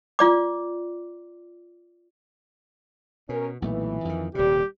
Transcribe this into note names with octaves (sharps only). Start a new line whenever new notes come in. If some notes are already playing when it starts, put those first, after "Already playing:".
F4 D5 D6
B2 C#4 A#4
B1 A#2 E3 A3
F2 D#3
D#1 C3 G3 G4